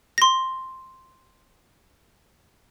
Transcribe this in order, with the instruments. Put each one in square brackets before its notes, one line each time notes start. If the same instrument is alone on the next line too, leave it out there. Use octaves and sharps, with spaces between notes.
[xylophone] C6 A#6